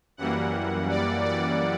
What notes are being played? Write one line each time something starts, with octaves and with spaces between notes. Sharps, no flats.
F#2 E3 G3 A#3 F#5
D5
D5